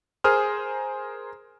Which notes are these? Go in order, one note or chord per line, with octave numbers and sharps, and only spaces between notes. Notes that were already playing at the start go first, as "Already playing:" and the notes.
G#4 A#4 C5 D#6 F6